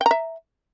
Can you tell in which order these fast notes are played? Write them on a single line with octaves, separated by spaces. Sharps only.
G5 A#5 E5